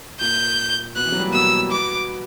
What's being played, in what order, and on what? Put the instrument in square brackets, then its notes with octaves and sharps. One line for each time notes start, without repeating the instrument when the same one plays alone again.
[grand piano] A#2 A#3 [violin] G6
[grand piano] B2 B3 [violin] F#6
[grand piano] E3
F#3
G3
A#3
[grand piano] B2 B3 [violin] E6
[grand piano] B2 B3 [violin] D6